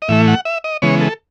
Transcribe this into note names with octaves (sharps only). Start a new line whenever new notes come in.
D#5
A2 E3 A3 E5
F#5
E5
D#5
C#3 E3 G#3 B3 C#5
A4